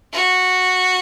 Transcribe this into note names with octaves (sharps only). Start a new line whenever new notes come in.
F#4